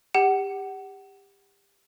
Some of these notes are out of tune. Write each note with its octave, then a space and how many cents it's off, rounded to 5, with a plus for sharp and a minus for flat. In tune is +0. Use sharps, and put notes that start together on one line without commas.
G4 +25 F#5 +25